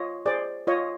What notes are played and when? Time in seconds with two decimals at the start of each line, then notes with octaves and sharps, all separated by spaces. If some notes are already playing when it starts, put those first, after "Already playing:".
Already playing: F4 C#5 D#5
0.26 G#4 C5 D5
0.67 F4 C#5 D#5